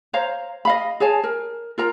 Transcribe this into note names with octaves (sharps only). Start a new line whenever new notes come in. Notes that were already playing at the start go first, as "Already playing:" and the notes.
C5 C#5 F5 A#5
D#5 F5 B5
G#4 C#5 G#5 A5
A#4
F4 A#4 A#5